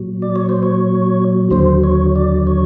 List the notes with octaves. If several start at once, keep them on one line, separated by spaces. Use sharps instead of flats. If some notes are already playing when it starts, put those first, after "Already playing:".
Already playing: A#2 F#3
D5
C#5
C5
C#5
D#2 D3 F#3 C5
C#5
D5
C#5